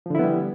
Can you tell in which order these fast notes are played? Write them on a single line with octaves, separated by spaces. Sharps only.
F3 D3 E4 B3 G3